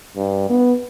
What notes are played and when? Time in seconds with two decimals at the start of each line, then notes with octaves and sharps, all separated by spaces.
0.16 G2
0.50 B3